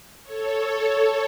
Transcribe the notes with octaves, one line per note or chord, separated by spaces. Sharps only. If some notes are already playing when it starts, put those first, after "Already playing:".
A4 C#5